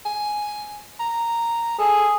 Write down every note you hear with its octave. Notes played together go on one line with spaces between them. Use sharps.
G#5
A#5
G#4 A4